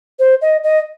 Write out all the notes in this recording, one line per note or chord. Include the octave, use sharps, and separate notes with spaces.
C5
D#5
D#5